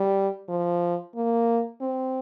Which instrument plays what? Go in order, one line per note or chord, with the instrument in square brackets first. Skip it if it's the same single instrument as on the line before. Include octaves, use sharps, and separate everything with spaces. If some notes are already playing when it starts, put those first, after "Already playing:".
Already playing: [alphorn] G3
F3
A#3
C4